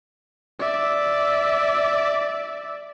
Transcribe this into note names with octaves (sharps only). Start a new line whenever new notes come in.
D5 E5